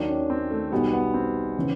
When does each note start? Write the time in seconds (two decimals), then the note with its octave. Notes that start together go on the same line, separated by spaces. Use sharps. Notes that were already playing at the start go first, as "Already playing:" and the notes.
Already playing: D#2 D#3 F#3 D4
0.08 C#4
0.30 C4
0.51 A3
0.72 B1 B2 G3 B3
0.93 B3
1.14 C4
1.58 C#3 E3